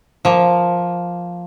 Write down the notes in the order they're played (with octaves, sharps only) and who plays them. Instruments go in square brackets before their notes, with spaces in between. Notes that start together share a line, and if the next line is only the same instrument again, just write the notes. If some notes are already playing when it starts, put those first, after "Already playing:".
[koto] F3 A#3